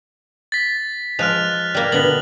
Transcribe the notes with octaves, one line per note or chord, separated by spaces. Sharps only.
A6 B6
F3 G#3 F6 F#6 F7
G3 A#3
B2 D3 B3 F#7